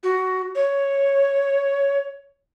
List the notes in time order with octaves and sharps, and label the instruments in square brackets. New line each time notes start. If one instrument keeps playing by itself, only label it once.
[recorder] F#4
C#5